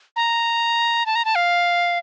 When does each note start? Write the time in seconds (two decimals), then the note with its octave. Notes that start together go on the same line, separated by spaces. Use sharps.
0.16 A#5
1.06 A5
1.16 A#5
1.25 A5
1.35 F5